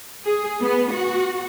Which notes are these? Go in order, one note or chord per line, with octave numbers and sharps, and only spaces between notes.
G#4
B3
F#4